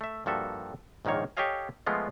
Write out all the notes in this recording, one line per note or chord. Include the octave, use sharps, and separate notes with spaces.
A3 E5
G2 F3 A#3 F#4 A4 E5
A#1 G#2 D#3 A#3 C#5
G4 A4 C#5 D#5 F5 G#5
F3 G#3 A3 B3 F4